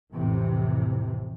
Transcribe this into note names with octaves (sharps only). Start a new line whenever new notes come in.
A1 F2 A2 C3 E3